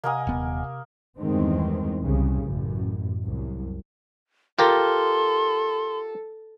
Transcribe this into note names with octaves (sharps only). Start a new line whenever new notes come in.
C3 A#3 A#4 D#5 F#5 G#5 D#6
D#1 B3
E2 G2 D#3 E3 G#3 C4
C2 C#3
A1 F#2
C2 F#2
F4 G4 A4 A#4 C6